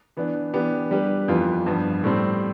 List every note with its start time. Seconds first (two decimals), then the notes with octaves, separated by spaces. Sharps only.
0.17 E3 B3 D4
0.53 E3 B3 D4 G4
0.91 G3 D4 G4 B4
1.28 F2 E3 B3 F4
1.66 G2 F3 B3
2.04 A2 G3 C4